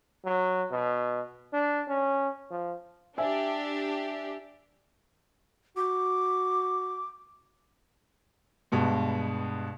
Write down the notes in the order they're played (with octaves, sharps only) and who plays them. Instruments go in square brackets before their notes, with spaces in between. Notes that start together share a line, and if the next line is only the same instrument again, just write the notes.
[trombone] F#3
B2
D4
C#4
F3
[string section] D4 G4 [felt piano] E5 G#5
[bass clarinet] F#4 [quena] D6
[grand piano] G2 B2 G#3